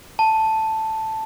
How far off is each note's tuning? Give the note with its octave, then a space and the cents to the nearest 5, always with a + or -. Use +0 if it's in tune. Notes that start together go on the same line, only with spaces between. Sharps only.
A5 +0